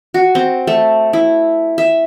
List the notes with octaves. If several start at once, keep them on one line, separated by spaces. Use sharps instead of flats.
F#4
C4
A3
E4
E5